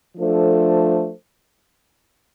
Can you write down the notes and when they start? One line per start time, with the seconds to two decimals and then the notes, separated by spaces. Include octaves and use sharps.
0.17 F3 A3 D4 A4 C5